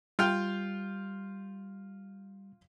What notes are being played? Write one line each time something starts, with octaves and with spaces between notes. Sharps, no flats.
G3 F4 F5 G5